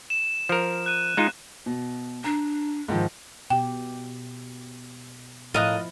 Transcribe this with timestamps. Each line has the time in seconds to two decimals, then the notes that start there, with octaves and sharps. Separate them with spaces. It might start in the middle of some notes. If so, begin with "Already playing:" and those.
0.10 E7
0.49 F3 A#4
0.86 F#6 D#7
1.17 G#3 D#4 F4
1.66 B2
2.24 D4 A#5
2.88 G#2 D#3 F3
3.50 B2 G4 G5
5.54 A2 F3 E4 F4 A#4 D#5 F5 F#6